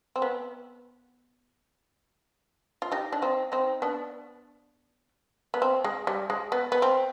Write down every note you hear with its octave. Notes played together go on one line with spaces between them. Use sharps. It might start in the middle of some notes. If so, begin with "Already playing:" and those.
C4
B3
F4
D#4 G4
D4
C4 D#4
C4 D#4
B3 D4
B3
C4
G#3
G3
G#3
B3
B3
C4